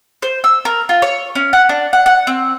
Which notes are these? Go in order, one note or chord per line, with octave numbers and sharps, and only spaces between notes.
C5
E6
A#4
F4
C#5
C#4
F#5
D4
F#5
F#5
C4